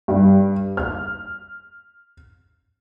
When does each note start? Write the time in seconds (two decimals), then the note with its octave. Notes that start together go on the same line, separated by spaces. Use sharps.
0.08 G2
0.77 F6